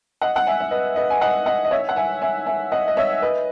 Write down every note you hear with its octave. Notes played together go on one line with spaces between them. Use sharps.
D#5 F#5
F#5
E5 G#5
E5
B4 D#5
B4 D#5
G#5
D#5 F#5
D#5 F#5
D#5
C#5 E5
F#5
E5 G#5
E5 G#5
E5 G#5
D#5 F#5
D#5
C#5 E5
B4 D#5